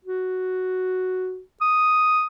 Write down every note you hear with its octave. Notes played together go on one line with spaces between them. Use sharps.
F#4
D#6